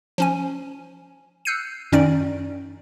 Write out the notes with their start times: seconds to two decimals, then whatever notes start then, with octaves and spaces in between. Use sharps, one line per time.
0.18 F3 C#4 G#5
1.45 E6 F#6 G6 C7 C#7 D#7
1.92 F#2 D#3 C#4 D#4 D5 D7